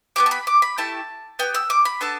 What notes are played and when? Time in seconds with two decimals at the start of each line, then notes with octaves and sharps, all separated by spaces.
0.16 B3 D4 G4 D6
0.26 A5
0.31 B5
0.47 D6
0.62 B5
0.78 A3 E4 G4 A5
1.39 B3 G4 G5
1.54 E6
1.70 D6
1.85 B5
2.01 B3 D4 A4 A5